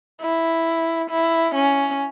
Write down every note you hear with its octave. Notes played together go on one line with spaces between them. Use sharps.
E4
E4
C#4